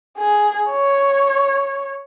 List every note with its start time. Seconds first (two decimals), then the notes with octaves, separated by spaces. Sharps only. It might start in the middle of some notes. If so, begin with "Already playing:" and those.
0.18 G#4
0.70 C#5